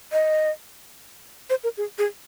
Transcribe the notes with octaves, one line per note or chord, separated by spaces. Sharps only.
D#5
C5
A#4
G#4
G#4